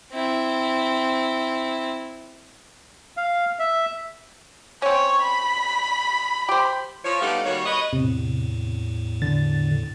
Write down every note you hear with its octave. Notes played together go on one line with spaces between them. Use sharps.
C4 E4
F5
E5
C4 C#4 C#5
B5
G4 C5
F3 C#5
G3 A3 B3 D#4 G4 F5
D#3 G3 A#3 F#4 C#5
B4 C#5 D#5
E2 A2 C3
D3 A6